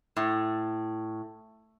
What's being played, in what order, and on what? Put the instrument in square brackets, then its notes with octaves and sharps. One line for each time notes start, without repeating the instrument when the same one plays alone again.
[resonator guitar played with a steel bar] A2